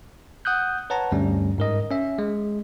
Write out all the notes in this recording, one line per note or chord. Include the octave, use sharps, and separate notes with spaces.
F#5 D#6 F#6 G6
B4 C#5 F#5 A5 A#5
D2 G2 G3 C#4
G#2 A#4 D#5
C#4 E5
G#3